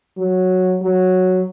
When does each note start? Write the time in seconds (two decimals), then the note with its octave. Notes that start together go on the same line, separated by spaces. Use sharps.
0.18 F#3
0.82 F#3